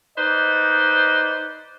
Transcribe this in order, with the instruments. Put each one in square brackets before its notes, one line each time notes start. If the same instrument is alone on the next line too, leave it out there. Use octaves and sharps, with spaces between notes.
[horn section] D#4 B4 C5 D5 D#5